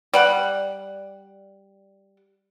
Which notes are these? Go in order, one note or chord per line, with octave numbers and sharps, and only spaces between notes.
G3 D5 F#5